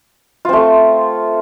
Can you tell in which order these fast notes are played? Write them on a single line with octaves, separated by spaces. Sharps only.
F4 C4 A3